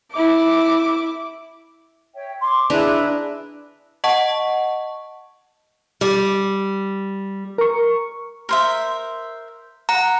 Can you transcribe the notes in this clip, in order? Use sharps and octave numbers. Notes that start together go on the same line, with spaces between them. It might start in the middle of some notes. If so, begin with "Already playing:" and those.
E4 D6
C#5 E5 G5
C6 D6
D4 E4 G#4 B4 A#5 F#6
D#5 F#5 A5 C#6
G3
A#4 C#6
A#4 C5 E5
F#5 A#5